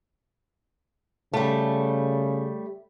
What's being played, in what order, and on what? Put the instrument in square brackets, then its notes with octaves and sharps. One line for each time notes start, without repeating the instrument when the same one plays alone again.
[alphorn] C#3 [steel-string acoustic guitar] G3 A3